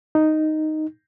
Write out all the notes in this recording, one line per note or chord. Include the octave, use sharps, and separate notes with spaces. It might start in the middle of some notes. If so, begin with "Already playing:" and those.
D#4